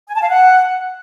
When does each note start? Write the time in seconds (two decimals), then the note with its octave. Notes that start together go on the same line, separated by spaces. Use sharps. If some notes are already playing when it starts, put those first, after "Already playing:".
0.08 G#5
0.15 A5
0.22 F5
0.29 F#5